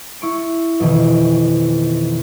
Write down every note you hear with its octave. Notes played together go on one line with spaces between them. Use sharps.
E4 C#6 D7
F2 B2 D#3 E3